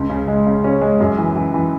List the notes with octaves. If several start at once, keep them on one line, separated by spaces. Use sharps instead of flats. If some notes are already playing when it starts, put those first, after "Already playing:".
Already playing: C#2
C#3
G#3
C#3
C#4
G#3
F#2
E3
E3
E3